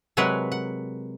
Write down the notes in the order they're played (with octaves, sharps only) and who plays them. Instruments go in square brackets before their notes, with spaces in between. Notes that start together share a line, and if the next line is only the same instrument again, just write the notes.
[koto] C3 F#3 G#3 A#4 B4 F#5
F#5